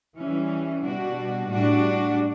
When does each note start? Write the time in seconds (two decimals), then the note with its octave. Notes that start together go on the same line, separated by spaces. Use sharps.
0.18 E3 G3 C#4
0.84 B2 G3 D4 F#4
1.49 A2 G3 D4 F#4